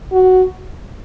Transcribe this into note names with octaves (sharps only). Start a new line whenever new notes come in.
F#4